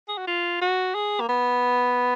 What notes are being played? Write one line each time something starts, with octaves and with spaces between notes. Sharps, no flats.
G#4
F#4
F4
F#4
G#4
A#3
B3